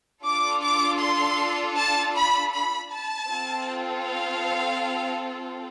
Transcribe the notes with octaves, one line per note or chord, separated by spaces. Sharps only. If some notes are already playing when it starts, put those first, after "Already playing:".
D4 F4 A4 D6
D6
C6
A5
B5
B5
A5
C4 F4 A4
F5